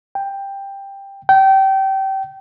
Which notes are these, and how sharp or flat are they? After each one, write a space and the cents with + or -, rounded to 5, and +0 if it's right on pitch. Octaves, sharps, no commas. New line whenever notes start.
G5 +10
G5 -25